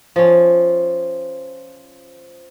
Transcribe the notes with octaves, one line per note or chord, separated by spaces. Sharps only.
F3 C#4